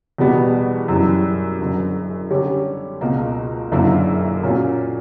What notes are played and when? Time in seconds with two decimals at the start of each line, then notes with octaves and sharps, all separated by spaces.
0.18 E2 B2 G3 B3 F#4
0.88 F#2 E3 G3
1.60 F#1 F#2 D3
2.30 D3 G3 C#4 G4 C#5
3.01 C#2 B2 A#3
3.71 F#1 F#2 D3 A#3 E4
4.43 A#2 A#3 C#4 F#4